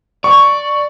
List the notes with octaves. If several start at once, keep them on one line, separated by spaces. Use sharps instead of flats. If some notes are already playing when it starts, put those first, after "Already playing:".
D5 C#6